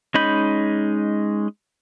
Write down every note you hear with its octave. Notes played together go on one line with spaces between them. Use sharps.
G#3 C#4 D#4 B5 G6